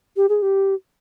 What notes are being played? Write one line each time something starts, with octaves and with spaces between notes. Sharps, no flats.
G4
G#4
G4